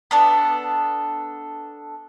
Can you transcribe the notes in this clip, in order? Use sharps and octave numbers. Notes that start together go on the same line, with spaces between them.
B3 D4 A4